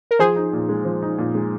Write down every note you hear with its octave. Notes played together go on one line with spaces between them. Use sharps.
A#4
F3 G#4 C5
D#4
A#2
G#3
F3
D#4
A#2
G#3